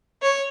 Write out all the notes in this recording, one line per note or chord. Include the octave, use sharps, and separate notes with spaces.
C#5